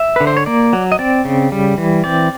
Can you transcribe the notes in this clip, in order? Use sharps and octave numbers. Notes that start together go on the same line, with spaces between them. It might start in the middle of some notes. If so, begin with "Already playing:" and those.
Already playing: E5
D3 B4
C5
C#5
A#3 D5
F#3
D#5
C4 D5
C#3
G3
E3
C4 D5